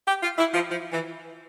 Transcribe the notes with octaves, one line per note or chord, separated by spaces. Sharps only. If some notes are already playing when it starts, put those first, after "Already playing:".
G4
F4
E4
F3
F3
E3